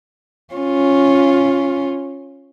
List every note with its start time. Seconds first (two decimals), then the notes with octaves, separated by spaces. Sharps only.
0.54 C#4 F4